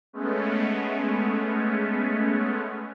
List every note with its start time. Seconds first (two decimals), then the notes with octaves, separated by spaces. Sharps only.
0.13 G#3 A3 B3 C#4